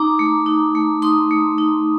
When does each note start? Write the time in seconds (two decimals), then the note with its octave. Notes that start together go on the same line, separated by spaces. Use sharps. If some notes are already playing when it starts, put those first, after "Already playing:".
Already playing: D#4 A#5 D6
0.19 A3
0.46 D#4
0.75 A3
1.02 D#4 C6 D#6
1.31 A3
1.58 D#4